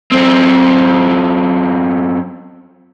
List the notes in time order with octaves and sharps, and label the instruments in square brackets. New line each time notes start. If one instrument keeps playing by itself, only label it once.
[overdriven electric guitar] F#2 C4